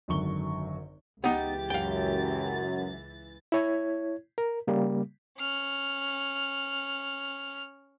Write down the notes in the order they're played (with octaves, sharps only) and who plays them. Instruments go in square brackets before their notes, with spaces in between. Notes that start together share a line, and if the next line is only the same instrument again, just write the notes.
[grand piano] G#1 F#2 D3 C#6 G7
[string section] C#2 E3 A6 [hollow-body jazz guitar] B3 D#4 [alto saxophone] G4
[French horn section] F#2 [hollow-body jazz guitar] F5 G5
[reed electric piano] E4 C#5 G#6
A#4
C#3 G3 A#3
[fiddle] C#4 F6